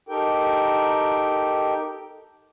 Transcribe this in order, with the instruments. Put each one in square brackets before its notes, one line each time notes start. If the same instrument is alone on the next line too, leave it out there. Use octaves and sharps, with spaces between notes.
[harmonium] D#4 G4 A4 A#4 G5